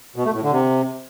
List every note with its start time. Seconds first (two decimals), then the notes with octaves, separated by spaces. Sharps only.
0.16 B2
0.25 A3
0.34 A2
0.43 D3
0.52 C3